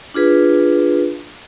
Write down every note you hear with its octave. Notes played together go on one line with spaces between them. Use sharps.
D4 F4 G#4 B4